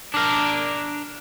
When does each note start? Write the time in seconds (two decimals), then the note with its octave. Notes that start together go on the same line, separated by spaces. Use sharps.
0.14 D4 A#4